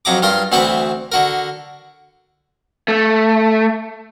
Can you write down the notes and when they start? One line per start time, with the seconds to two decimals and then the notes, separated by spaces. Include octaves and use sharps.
0.05 F2 F#3 A#5 D6
0.23 G2 F4 A#4 C6
0.52 D2 E3 C4 F#4 C5 B5
1.12 D3 F#4 A#4
2.88 A3